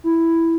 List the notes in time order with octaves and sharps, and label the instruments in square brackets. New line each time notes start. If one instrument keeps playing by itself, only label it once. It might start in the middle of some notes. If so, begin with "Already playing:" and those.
[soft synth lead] E4